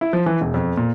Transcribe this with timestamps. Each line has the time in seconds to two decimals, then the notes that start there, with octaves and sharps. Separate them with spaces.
0.01 E4
0.13 F3
0.26 E3
0.41 E1
0.54 F2
0.77 A#2